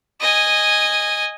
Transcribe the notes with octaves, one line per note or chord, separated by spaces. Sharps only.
D#5 G#5